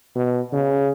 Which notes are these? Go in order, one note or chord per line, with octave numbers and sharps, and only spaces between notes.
B2
C#3